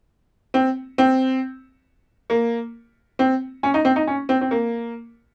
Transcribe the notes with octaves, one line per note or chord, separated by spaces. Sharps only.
C4
C4
A#3
C4
C#4
D#4
C4
D#4
C#4
C4
C4
A#3